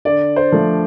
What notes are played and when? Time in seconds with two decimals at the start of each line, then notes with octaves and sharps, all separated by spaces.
0.05 D3 D5
0.36 C5
0.52 F3 A3